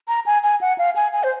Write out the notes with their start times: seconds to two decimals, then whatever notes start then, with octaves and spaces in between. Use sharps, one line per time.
0.08 A#5
0.26 G#5
0.43 G#5
0.61 F#5
0.78 F5
0.96 G#5
1.13 G#5
1.23 C5